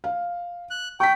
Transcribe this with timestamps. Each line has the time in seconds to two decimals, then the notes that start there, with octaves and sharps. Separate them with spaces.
0.04 F5
0.71 F#6
1.00 G5 C#6 B6